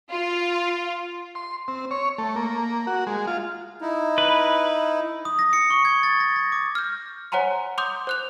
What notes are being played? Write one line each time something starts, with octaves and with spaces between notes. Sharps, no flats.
F4
C6
C4
C#5
A3
A#3
F#4
G#3
F4
D#4 E4
B4
D#6
A#6
C#7
C#6
G#6
A6
A#6
A#6
D6
F6 G6
C5 C#5 F#5 G#5 A#5 C6
C6 D6 D#6 G6
C5 F#6 F7